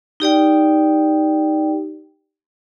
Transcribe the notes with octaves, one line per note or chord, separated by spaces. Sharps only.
D#4 G4 D5 G5